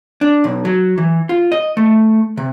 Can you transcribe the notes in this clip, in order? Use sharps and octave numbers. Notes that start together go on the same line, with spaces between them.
D4
B1
F#3
E3
F4
D#5
A3
C3